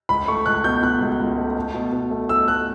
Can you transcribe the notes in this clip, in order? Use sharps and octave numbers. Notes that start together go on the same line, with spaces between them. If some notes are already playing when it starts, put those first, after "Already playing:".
C#2 B5
A3 C#6
C#2 F#6
B2 G6
B2 F#6
C#2
C#2
A3
A3
B2
B2
A3
A3 E6
A3 F#6